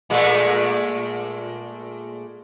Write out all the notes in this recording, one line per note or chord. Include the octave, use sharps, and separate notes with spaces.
A#2 G#3 A3